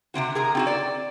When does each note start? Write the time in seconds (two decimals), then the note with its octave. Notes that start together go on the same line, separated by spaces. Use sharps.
0.14 C3 D#3 C4 F#4
0.35 G#4 A#4 A#5
0.55 C4 F4 F#4
0.67 D5